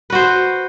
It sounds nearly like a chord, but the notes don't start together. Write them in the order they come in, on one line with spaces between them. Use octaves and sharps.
B4 F#4 C5